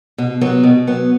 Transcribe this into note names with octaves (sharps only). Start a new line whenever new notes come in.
B2
F#3 B3
B2
F#3 B3